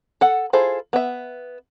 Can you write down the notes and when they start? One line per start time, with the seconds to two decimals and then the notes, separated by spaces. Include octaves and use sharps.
0.21 A4 F#5
0.53 E4 F4 G#4 A4 C5
0.93 B3 E5